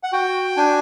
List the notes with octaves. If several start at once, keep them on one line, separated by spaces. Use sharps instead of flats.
F#5
F#4 G5
D4 G#5